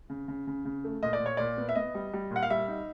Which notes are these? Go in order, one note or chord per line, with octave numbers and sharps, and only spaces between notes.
C#3
C#3
C#3
C#3
A3
A#2 D#5
D5
A#2
C#5
A#2 D5
B3
E5
B3 D#5
G3
G3
A#2
F#5
F5
G3 E5
D#4